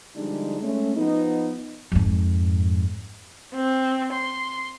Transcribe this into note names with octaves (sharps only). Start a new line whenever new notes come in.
D3 F3 G3 G#3 D4 D#4
G#3 A3 C#4
F3 B3 D#4
F2 G#2
C4
C6